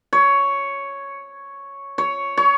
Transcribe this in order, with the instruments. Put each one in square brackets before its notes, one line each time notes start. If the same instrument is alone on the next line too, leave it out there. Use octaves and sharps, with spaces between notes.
[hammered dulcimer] C#5
C#5
C#5